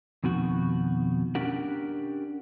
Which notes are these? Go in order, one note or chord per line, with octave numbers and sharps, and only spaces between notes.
F2 B2 D#3 F#4
C#4 D4 G4 A#4 F#5